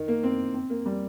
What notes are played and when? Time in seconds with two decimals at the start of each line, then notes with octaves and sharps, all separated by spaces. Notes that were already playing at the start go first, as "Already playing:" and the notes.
Already playing: D#3
0.08 A#3
0.23 C4
0.54 C4
0.70 A#3
0.86 G3